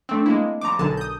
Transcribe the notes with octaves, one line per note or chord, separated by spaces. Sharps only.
A3 C4 D4
G#3 A#3 E4
A2 F3 G3 A#5 D6
B1 D3 F#4 G#4 A#4 A5
D#6 G6